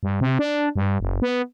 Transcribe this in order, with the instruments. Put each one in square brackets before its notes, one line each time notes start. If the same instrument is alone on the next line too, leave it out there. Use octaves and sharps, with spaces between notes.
[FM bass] G2
C3
D4
G2
F#1
B3